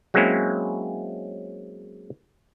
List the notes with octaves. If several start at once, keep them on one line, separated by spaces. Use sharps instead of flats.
F#3 G#3 A#3 C4 C#4 E4